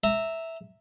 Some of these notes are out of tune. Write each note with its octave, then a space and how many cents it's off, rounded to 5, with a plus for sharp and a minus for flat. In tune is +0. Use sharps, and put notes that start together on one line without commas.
E5 -5 A#5 -20